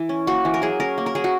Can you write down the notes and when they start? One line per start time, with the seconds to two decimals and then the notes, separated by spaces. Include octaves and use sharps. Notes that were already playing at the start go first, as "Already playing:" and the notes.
Already playing: E3 E4
0.09 C#4
0.27 A#3 F#4
0.45 E3
0.54 A#4
0.62 F#3 G#4
0.80 C#4 A#4
0.98 A#3
1.06 A#4
1.15 F#3 G#4
1.24 F#4